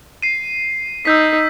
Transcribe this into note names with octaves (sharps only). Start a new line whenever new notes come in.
C7 D#7
D#4 E6 G6 B6